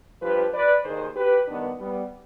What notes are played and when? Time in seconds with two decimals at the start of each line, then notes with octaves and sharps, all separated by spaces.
0.22 G2 F3 G4 B4
0.53 B4 D5
0.85 D#2 D#3 G#4 C5
1.16 G4 B4
1.48 G2 D#3 B3 D4
1.80 G3 B3